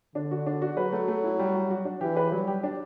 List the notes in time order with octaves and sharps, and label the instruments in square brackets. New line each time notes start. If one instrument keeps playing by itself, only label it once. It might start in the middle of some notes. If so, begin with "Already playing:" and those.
[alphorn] D3 [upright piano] D4
[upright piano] F#4
D4
F#4
[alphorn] F#3 [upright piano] B4
[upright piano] A3
A3
E4
G3
F#4
F#4
D4
[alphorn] E3 [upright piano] G4
[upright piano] B4
[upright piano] F#3 [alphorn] G3
[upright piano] G4
D4